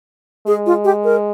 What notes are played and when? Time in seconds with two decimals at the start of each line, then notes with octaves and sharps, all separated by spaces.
0.47 G#3 G#4
0.66 F4
0.84 G4
1.04 A#4